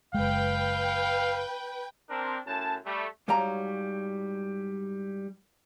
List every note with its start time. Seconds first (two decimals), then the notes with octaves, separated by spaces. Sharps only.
0.14 F#1 G#3 B4 F5 G5
2.09 C4 D4 A#4
2.46 F#2 A2 C#4 A5
2.85 G3 A3
3.28 G#2 F#3 G3 C#5 F5 A#5